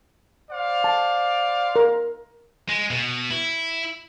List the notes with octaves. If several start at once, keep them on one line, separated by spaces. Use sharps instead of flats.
C5 D5 F5
A5
A#4
G#3
B2
E4